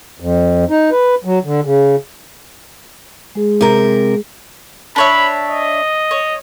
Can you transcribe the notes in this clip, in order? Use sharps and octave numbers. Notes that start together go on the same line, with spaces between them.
F2
D#4
B4
F#3
D3
C#3
G#3 G#4
C3 A#4
D4 C#5 E5 B5
D#5
C#5